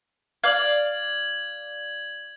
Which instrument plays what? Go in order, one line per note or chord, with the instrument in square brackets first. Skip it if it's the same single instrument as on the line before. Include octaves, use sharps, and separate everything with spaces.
[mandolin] D5 F5 [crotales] G#6 F#7